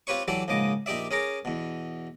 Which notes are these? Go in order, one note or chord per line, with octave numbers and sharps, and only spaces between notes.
C4 F4 G4 B4 C#5 C#6
E3 F#3 G4 A4 D5
A#1 G#2 C#3 D#5 D6
A#1 D#4 G4 D5 E5
C#4 G#4 A#4 A#5 D6
E2 B2